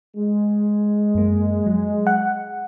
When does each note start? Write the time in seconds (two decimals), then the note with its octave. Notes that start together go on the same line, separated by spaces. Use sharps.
0.16 G#3
1.15 F#2 A#3
1.66 F#3
2.07 F#5